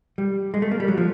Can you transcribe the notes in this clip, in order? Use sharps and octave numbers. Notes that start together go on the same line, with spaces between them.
G3
G#3
A3
A#3
G3
F#3
F3